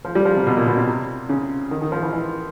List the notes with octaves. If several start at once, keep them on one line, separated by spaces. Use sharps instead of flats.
F3
G3
F3
C3
B2
A#2
B2
C3
C#3
D#3
D#3
F3
E3
E3